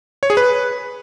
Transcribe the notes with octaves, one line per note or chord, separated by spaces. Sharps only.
C#5
G#4
B4